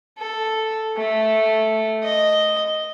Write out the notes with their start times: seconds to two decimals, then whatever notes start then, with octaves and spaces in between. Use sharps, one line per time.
0.18 A4
0.97 A3
2.04 D#5